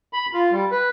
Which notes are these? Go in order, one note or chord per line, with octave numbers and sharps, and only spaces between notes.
B5
F4
G3
B4